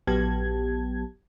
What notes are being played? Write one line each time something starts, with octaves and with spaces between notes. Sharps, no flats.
A#1 F#3 B3 G4 A5 G#6